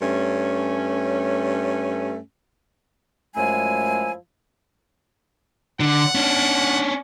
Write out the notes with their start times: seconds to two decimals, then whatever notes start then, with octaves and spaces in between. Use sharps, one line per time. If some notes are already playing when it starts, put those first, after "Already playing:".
0.01 G2 A3 C#4
3.36 F#2 F3 G#3 A3 E4 G#5
5.80 D3 F#5
6.15 C#4 D4